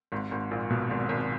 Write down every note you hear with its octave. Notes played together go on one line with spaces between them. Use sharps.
G#1 G#2
G#1 G#2
A#1 A#2
B1 B2
G#1 G#2
G#1 G#2